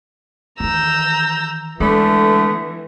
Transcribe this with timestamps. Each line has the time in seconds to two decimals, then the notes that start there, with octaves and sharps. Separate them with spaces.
0.60 D#3 E3 A#5 E6 G6
1.80 D3 E3 G#3 A3 B3